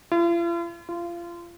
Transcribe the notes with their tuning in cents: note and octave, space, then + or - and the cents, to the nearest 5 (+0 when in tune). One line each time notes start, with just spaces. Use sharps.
F4 -45
F4 -25